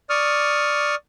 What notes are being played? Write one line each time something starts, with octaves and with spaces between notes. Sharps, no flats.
D5 C#6 D#6 F6